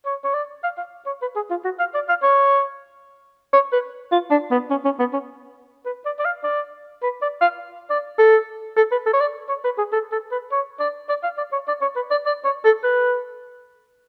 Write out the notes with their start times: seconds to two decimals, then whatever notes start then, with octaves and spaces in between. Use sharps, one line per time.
0.05 C#5
0.24 C#5
0.34 D5
0.63 F5
0.77 F5
1.06 C#5
1.22 B4
1.36 G#4
1.50 F4
1.64 F#4
1.79 F5
1.94 D5
2.09 F5
2.23 C#5
3.53 C#5
3.72 B4
4.12 F4
4.30 D4
4.51 B3
4.70 C#4
4.85 C#4
4.99 B3
5.13 C#4
5.85 B4
6.06 D5
6.19 D5
6.25 F5
6.44 D5
7.03 B4
7.22 D5
7.41 F5
7.90 D5
8.19 A4
8.77 A4
8.91 B4
9.06 A4
9.13 C#5
9.20 D5
9.49 C#5
9.64 B4
9.78 G#4
9.92 A4
10.12 A4
10.31 B4
10.52 C#5
10.80 D5
11.09 D5
11.23 F5
11.38 D5
11.52 C#5
11.68 D5
11.81 C#5
11.96 B4
12.11 D5
12.26 D5
12.44 C#5
12.65 A4
12.84 B4